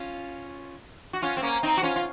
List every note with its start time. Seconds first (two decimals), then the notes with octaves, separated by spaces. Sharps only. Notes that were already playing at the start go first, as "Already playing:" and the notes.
Already playing: C#4 F4
1.13 F#4
1.22 C#4 F4
1.37 C4
1.42 A#3 C#4
1.63 C4 D#4
1.78 F#4
1.83 C#4 F4
1.96 F4